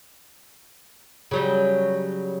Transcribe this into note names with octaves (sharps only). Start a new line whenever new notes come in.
C#3 F#3 G3